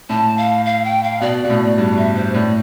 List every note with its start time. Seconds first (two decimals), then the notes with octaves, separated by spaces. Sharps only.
0.09 A2 A5
0.38 F5
0.65 F5
0.84 G5
1.03 F5
1.21 B2 D5
1.45 B2
1.50 A2
1.78 G2
1.97 E5
2.15 C5
2.34 A2 D5